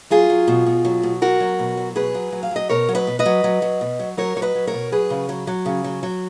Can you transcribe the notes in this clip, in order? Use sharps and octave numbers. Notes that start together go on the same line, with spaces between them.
F#3 F4 G#4
F#3
B2
B2
F#3
B2
F#3 F#4 A#4
F#3
B2
F#3
B2 G#4 B4
F#3
F#3
F5
F#3 D#5
B2 A#4 C#5
F#3
B4 D#5
B2
B4 D#5
F#3
F#3
F#3
B2
F#3
F#3 A#4 C#5
F#3 C#5
B4 D#5
F#3
A#4 C#5
B2
F#3 G#4 B4
C#3
F#3
F#3
C#3
F#3
F#3